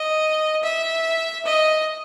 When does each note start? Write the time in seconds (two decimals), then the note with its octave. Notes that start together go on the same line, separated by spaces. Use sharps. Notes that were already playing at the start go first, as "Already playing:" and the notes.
Already playing: D#5
0.63 E5
1.46 D#5